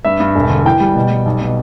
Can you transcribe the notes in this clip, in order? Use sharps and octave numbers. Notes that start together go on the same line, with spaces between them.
G2 E5
G2
E1
D3
E3 G5
G3
B2
G3
B1
B2